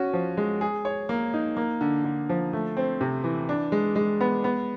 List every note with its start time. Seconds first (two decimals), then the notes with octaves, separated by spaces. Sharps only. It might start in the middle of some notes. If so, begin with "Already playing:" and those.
Already playing: C#4 F#4
0.13 F3
0.37 G#3
0.61 G#4
0.85 C#5
1.09 A#3
1.34 D#4
1.57 A#3
1.81 D3
2.05 D3
2.29 F3
2.53 A3
2.77 C4
3.01 C3
3.24 E3
3.49 D4
3.72 G#3
3.96 G#3
4.21 B3
4.44 B3